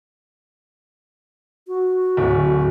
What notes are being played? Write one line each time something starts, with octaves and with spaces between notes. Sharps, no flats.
F#4
D1